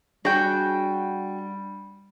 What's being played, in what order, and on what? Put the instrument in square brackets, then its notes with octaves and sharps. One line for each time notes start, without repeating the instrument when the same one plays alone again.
[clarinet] G3 [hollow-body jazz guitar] D4 G#4 C#5 [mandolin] F#4 G5